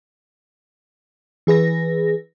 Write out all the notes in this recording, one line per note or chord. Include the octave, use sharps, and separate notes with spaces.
E3 G#4 B4 A#6